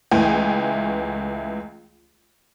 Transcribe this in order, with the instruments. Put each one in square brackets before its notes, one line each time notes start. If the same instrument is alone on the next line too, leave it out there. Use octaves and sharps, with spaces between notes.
[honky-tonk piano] C#2 E3 A3 G5 G#5